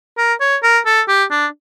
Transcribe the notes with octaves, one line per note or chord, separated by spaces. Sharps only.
A#4
C#5
A#4
A4
G4
D4